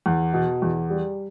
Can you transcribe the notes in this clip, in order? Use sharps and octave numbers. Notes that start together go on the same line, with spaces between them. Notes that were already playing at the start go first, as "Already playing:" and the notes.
E2
B2
E2
G3